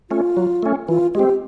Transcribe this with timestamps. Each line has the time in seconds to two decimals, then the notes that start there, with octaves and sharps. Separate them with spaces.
0.10 A3 C#4 F4
0.37 F#3
0.63 A3 C#4
0.88 E3 F4
1.15 G#3 C4 G4